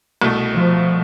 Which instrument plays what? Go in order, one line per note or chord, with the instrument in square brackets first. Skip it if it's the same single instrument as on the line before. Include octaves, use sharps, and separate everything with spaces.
[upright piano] C2 B2 A3
[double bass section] F3